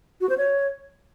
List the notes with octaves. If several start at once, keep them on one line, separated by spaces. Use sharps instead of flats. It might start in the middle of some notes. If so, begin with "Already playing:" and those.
F#4
C5
C#5